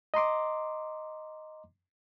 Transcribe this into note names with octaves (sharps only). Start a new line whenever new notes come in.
D#5 A#5 C6 D6